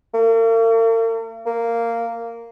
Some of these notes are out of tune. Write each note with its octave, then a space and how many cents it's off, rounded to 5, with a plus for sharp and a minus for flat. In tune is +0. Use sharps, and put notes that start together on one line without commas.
A#3 -45
A#3 -10